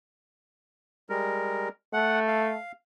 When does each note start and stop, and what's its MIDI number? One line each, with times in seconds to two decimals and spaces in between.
1.10 1.69 55
1.10 1.69 56
1.10 1.69 70
1.93 2.55 57
1.93 2.19 78
2.28 2.72 77